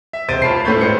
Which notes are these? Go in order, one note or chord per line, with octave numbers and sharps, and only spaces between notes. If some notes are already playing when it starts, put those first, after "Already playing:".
E5
E1 C3 C5 A6 D7 D#7
D1 F4 C#5 A5 B5 C7
A2 A3 C#4 C#5 B5 G6
G#1 G#3 B4 C5 C#7